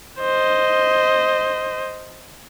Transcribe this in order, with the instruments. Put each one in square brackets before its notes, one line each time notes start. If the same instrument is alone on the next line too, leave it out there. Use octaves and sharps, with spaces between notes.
[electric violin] C5 D#5